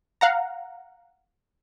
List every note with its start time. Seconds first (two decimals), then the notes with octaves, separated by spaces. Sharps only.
0.21 F5 F#5 A#5